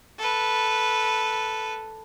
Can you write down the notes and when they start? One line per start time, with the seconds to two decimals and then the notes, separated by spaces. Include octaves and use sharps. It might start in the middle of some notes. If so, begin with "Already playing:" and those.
0.18 A4 B4